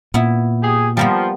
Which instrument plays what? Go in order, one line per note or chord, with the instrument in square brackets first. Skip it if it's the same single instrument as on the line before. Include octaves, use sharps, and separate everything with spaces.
[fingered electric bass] A#2 [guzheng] B3 E4
[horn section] G4 G#4
[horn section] F3 [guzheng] G3 A#3 B3